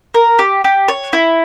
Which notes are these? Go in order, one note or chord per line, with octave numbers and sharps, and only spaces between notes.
A#4
G4
G4
C#5
E4